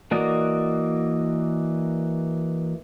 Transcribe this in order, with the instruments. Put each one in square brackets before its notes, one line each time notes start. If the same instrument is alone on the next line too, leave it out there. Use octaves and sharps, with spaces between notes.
[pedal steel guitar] E3 A#3 F#4 D5 D#5